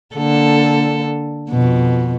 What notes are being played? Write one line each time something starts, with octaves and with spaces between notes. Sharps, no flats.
D3 A#3 A4
F2 B2